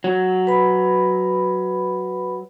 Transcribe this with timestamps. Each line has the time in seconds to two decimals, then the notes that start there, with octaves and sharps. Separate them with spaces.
0.04 F#3
0.47 B4 B5